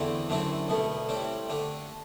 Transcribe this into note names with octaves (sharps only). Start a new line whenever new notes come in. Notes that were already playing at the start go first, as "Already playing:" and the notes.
Already playing: E2 D3 A3 C4 E4
F#2 D3 A3 C4 E4
C2 B2 A3 E4
A2 G3 C4 E4
D3 A3 D4